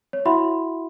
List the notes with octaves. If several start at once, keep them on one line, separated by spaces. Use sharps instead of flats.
C#5
E4 F#4 E5 F#5 B5 C6